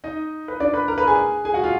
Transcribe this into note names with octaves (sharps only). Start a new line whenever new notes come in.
D#4 D#5
B4
D4 D5
B4 B5
A#4 A#5
B4 B5
G#4 G#5
G#4 G#5
F#4 F#5
F4 F5